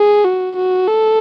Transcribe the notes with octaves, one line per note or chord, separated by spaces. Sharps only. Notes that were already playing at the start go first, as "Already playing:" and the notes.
Already playing: G#4
F#4
F#4
A4